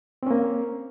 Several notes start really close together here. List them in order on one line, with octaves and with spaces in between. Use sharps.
C4 C#4 A#3